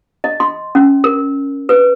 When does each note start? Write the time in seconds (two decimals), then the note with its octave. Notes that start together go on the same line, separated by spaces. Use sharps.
0.24 D#5
0.40 C6
0.75 C#4
1.04 A#4
1.69 B4